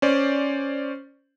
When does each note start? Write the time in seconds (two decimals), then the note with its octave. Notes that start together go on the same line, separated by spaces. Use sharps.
0.02 C#4 C5 D5